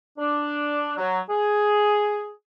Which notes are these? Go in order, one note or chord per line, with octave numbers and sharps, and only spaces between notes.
D4
F#3
G#4